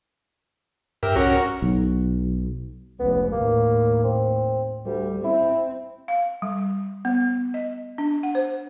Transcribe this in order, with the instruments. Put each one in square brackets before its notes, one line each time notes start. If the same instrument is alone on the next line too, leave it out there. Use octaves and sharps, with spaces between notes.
[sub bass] G2 [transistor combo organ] G4 E5 [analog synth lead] A#4
[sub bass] C2 [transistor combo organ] C#4 A#4 [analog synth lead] F#4
[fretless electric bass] B1
[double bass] F1 C#2 [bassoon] B3
[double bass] D#2 A2 [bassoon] A#3
[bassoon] C4
[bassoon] D2 [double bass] G3
[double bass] C4 [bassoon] E4
[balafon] F5
G3
B3
D#5
D4
F#5
C5